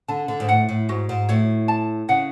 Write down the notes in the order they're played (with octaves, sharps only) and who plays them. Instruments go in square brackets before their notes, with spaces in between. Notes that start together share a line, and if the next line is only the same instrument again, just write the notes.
[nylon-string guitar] D3 [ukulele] A5
[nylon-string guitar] D3
G#2
[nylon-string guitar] A2 [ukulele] F#5
[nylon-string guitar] A2
[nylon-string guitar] G#2 [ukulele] F#4
[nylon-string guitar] G#2
[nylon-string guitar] A2 [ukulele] C#5
[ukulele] A5
[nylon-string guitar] C#3 [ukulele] F#5